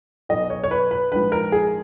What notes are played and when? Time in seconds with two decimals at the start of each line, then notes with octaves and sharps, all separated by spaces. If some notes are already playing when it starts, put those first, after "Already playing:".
0.29 B1 B2 D#5
0.50 C#5
0.64 C#5
0.71 B4
0.91 B4
1.12 A#1 G#2 F3 B4
1.32 A#4
1.52 G#4